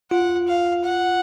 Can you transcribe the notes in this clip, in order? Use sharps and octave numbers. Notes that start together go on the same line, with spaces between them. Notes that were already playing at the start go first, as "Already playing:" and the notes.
F4 F#5
F5
F#5